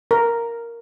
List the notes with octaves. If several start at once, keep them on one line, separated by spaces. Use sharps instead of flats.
A#4